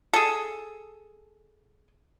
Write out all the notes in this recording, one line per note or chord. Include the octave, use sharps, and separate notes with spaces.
G#4 A4